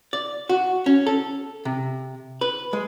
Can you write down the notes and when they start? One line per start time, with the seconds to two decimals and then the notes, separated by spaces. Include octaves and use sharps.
0.13 D5
0.49 F#4
0.86 C#4
1.07 A4
1.65 C3
2.41 B4
2.73 G#3